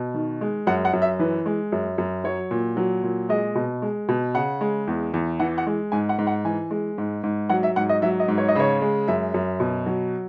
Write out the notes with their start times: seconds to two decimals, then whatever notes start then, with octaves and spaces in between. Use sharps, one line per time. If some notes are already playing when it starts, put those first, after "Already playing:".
Already playing: B2
0.14 D#3
0.41 G#3
0.67 F#2 F#5
0.85 F#5
0.93 F#2
1.02 E5
1.19 E3 B4
1.46 G#3
1.72 F#2
1.98 F#2
2.24 F#3 C#5
2.51 A#2
2.77 F#3
3.03 A#2
3.29 G#3 D#5
3.55 B2
3.82 G#3
4.09 B2
4.34 C#3 F#5
4.61 G#3
4.87 E2
5.14 E2
5.40 E3 F#5
5.58 F#5
5.66 G#3
5.92 G#2 G#5
6.09 F#5
6.19 G#2
6.27 F#5
6.45 E3 G#5
6.71 G#3
6.98 G#2
7.24 G#2
7.49 F#3 F#5
7.63 E5
7.76 G#2 F#5
7.89 D#5
8.02 F#3 E5
8.20 D#5
8.28 G#2
8.38 C#5
8.49 D#5
8.55 C#3 C#5
8.81 G#3
9.08 F#2 E5
9.34 F#2
9.60 B2
9.86 F#3